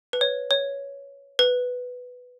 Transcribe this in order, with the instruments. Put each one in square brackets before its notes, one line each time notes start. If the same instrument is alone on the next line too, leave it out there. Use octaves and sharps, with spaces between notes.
[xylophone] B4
C#5
C#5
B4